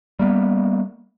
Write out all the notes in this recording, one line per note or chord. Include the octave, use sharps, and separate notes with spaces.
G3 A#3 B3